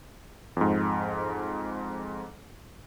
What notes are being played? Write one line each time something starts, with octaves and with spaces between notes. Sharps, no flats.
F2 G#2